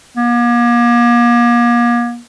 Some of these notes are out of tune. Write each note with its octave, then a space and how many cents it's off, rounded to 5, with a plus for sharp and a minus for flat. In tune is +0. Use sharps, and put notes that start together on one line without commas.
A#3 +40